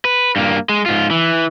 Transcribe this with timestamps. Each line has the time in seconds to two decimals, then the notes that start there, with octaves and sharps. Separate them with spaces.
0.05 B4
0.36 G2 A#3
0.69 G#3
0.86 G#2 F4
1.11 E3